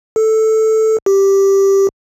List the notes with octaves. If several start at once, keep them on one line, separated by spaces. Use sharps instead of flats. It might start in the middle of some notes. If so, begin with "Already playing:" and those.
A4
G4